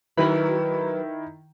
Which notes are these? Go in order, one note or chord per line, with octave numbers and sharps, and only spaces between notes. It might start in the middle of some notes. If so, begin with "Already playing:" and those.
D#3 F#3 E4 A#4 B4